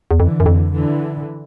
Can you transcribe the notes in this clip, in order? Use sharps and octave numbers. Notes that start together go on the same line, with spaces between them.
E2
F2 D3 E3
F#2
F2
D3 E3